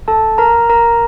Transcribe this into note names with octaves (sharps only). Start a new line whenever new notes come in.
A4 A5
A#4 A#5
A#4 A#5